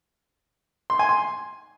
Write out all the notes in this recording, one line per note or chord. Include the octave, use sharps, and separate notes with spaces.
C6
G#5
C6